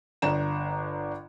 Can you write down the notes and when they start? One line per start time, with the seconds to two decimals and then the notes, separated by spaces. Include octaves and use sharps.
0.22 G1 D4 A#5 E7